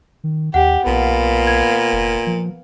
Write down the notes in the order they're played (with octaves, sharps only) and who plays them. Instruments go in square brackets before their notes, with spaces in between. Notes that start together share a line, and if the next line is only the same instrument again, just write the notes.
[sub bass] D#3
[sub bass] D#2 [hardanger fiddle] G4 [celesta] F#5
[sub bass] B1 [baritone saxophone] A#2 [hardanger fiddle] B3 F5
[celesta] G#6
[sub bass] F1
F3